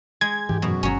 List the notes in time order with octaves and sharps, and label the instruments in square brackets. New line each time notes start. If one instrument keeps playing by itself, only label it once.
[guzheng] G#3 [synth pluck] G#6
[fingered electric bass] G#2 E3 [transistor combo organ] G4
[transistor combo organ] F#2 [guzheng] B2
[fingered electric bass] G1 [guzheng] F#3 C#4